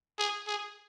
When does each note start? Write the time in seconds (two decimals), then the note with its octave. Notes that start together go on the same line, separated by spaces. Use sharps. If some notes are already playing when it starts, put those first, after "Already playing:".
0.18 G#4
0.47 G#4